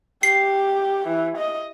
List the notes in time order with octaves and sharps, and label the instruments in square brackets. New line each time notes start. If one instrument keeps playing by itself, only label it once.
[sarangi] G4 [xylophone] C7
[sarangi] E3
D#5